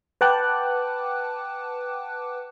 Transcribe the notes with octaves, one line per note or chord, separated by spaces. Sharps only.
B4 F#5 G5 A5 D6 F#6